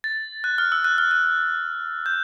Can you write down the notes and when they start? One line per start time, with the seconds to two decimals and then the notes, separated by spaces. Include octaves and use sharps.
0.04 A6
0.44 F#6
0.58 F6
0.72 E6
0.84 F#6
0.98 F6
1.11 F#6
2.06 G6